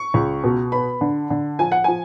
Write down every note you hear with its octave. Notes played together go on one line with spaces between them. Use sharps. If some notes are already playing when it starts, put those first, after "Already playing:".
Already playing: C#6
C#2
B2
B3 B5
D3
D3
F3 G#5
F#5
F3 G#5